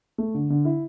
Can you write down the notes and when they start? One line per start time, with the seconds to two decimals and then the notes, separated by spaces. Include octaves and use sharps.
0.18 A3
0.35 D3
0.50 D3
0.65 E4